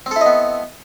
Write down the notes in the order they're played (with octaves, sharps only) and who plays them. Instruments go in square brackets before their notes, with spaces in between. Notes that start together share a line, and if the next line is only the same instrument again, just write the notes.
[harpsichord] C4
A4
E4
D#5
B3